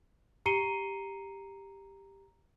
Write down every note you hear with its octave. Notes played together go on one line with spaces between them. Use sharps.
G4 A#5 C7 C#7 D#7 G7